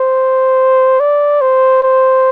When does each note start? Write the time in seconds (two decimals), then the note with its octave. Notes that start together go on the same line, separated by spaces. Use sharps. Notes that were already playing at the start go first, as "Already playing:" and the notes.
Already playing: C5
1.00 D5
1.41 C5
1.83 C5